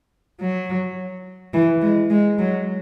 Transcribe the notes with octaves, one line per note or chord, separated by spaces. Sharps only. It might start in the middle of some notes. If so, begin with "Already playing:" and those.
F#3
E3
G#3
G#3
F#3